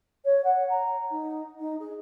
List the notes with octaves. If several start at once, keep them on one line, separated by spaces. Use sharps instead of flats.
C#5
F#5
A#5
D#4
D#4
G#4